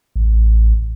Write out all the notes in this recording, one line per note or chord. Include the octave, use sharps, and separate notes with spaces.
A1